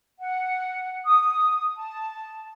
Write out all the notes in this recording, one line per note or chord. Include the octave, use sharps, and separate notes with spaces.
F#5
D#6
A5